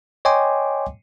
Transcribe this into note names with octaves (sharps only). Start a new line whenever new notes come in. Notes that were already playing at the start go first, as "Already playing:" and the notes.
C#5 D#5 G5 G#5 C6 D6